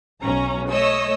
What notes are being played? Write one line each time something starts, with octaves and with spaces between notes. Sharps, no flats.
B1 C#4 A#5
A3 C#5 D#5 E6